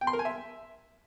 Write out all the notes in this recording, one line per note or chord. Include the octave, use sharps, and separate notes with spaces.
G5
C6
A#4
G#5
E5